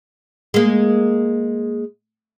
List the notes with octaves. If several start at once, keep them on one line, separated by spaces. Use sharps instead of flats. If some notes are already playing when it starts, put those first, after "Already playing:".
G#3 A#3